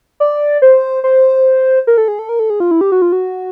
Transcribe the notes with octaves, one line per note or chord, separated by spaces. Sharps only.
D5
C5
C5
A#4
A4
G#4
A4
A#4
A4
G#4
F4
E4
G4
F#4
F4
F#4